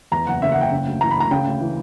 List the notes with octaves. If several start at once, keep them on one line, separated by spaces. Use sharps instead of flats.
E2 A#5
F#1 F#5
C#3 E5
F#5
F#1 G5
C#3
D2
E3 A#5
B5
D2 A#5
C#3 G5
D2
E3